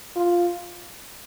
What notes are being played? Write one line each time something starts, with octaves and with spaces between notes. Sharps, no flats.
F4